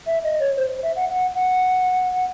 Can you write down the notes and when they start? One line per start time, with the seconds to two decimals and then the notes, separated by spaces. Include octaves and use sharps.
0.06 E5
0.24 D#5
0.40 C#5
0.57 C5
0.83 E5
0.96 F#5
1.09 F#5
1.34 F#5